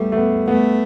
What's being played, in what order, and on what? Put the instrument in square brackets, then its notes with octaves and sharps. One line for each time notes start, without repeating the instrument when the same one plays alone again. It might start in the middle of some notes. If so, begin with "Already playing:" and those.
Already playing: [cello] G3 [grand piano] A3 B3
[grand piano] A3
B3
[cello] A3 [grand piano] B3